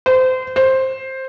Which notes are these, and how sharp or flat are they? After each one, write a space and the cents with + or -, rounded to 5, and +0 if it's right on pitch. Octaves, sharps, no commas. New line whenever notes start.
C5 -25
C5 +10